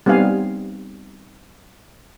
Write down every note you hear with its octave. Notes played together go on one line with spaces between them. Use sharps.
G3 B3 C4 D#4 F5 G#5